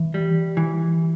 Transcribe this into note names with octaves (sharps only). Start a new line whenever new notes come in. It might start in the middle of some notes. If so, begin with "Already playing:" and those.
Already playing: E3
G3
E3